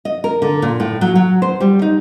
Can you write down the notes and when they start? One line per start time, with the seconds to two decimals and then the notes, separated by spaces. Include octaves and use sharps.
0.05 D#5
0.24 A#4
0.42 D3
0.62 A#2
0.80 A2
1.01 F#3
1.15 F#3
1.42 C5
1.60 G3
1.82 D#4